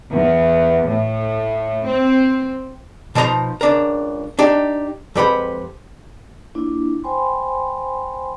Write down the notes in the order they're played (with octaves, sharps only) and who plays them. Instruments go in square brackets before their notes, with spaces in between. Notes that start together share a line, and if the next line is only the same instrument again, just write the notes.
[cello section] E2
A2
C4
[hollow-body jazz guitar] B2 F3 D#4 C#5 A#5 C6
C#2 D4 A#4
D4 D#4 G4
F2 G#3 G4 B4 F#5 B5
[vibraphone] A#3 D4 E4 F4
C5 G5 G#5 B5 C6